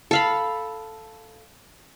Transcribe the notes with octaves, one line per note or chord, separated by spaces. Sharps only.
A4 F5 B5